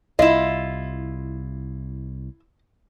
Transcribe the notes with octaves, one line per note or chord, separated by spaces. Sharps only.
C2 E4 F4 D#5